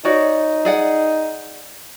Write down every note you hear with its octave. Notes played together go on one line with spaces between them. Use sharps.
D#4 F#4 C#5 D5
G#4 D5 F#5